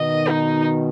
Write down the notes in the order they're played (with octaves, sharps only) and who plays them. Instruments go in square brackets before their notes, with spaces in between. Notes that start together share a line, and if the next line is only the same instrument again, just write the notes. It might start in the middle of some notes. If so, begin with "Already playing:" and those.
Already playing: [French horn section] B2 D#3 [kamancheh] D#5
[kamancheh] D#4